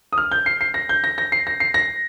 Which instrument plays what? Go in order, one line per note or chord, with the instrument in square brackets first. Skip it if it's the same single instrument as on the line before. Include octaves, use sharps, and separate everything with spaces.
[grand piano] D#6
F6
G6
C7
C7
A#6
G6
A#6
A#6
C7
A#6
C7
A#6